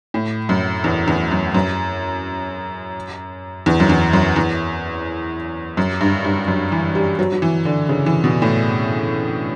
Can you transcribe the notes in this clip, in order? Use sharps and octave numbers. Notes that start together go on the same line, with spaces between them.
A2
F#2
E2
E2
F#2
F#2
E2
F#2
E2
F#2
E2
F#2
G2
G2
F#2
E3
G3
F#3
F#3
E3
D3
C#3
E3
B2
A2